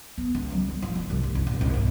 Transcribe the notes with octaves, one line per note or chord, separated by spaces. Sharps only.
B3
C#2
F#3
G3
F3
D2
C2
F#1
C2
A#1
C2
G1